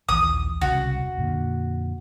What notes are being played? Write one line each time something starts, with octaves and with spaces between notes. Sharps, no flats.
A#1 D#2 E3 D#6
E1 C2 C#3 F#4
F2 A#2 D3